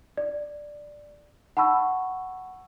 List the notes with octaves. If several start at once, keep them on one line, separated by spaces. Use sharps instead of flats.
D5
F#5 A5 B5 C#6 E6